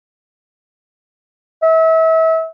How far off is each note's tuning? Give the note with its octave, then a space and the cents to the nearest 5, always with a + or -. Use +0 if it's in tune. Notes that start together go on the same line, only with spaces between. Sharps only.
E5 -35